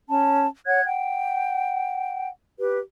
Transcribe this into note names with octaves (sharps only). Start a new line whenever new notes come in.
C#4 A5
C#5 F#5 F#6 G#6
F#5 G5
G4 B4